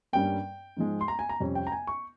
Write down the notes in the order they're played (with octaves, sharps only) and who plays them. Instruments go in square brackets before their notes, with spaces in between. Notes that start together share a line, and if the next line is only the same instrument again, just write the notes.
[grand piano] G2 G3 A#3 C#4 G5
G#2 F3 G#3
C6
A#5
G#5
A#5
F2 C3 G3 C#4
G5
A#5
G#5
C#6